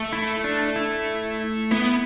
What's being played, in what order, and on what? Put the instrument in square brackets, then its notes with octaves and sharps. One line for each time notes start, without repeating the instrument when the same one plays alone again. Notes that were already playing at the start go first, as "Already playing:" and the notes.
Already playing: [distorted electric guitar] A3
[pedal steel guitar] E4
D4
E4
[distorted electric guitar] B3 [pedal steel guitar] E4